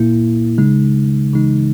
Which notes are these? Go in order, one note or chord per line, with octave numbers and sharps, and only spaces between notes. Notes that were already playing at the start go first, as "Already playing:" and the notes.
Already playing: A#2 A#3 E4
C#3 G#3 D#4
C#3 E3 G#3 D#4